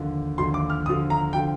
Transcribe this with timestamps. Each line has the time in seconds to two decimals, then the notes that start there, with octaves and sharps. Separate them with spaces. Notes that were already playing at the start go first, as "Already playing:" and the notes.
Already playing: D#2 D3 F3
0.38 D#2 D3 F3 C6
0.54 D6
0.70 F6
0.86 D#2 D3 F3 D#6
1.10 A#5
1.33 D3 F3 G5